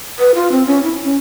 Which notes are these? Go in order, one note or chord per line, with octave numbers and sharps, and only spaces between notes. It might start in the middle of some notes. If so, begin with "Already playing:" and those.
B4
F4
C4
C#4
E4
C#4